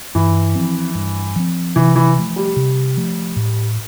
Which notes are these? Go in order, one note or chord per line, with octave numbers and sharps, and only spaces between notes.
G2 E3
F3 C4
G2
F3 C4
C3 E3
E3
F3 A3
G3
C3
F3 A3
A2